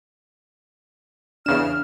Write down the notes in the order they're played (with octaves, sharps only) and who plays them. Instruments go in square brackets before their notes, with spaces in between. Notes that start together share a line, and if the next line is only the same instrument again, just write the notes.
[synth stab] E2 C#3 E7 [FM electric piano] D4 [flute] F6